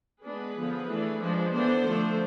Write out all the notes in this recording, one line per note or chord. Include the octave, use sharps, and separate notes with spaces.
G#3 B3 D4 G#4 B4
D3 F3 B3
E3 A3 D4
F3 G#3 D4
E3 B3 D4 A4 C5
D3 F3 A3 D4